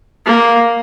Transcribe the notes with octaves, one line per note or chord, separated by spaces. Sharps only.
A#3